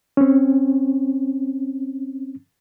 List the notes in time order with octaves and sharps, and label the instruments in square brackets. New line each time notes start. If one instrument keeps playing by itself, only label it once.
[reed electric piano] C4 C#4